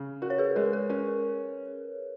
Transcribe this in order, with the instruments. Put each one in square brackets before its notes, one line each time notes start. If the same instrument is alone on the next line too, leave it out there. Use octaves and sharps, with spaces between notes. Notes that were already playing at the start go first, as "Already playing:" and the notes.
Already playing: [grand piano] C#3
[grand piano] F#4 [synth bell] A#4
[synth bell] C#5
G#4 B4
[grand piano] G#3 [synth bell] A#4
[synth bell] A#4
[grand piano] C#4 [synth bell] A#4